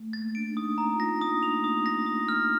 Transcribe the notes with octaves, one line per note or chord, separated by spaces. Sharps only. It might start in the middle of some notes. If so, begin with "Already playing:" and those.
Already playing: A3
A#3 A6
D4 D7
D#4
D#6
D4
A#5
C4
F4
D#4 A#6
D4
D#6
A#3
C4
A3 F7
A#3 D#6
A#6
D#6
F6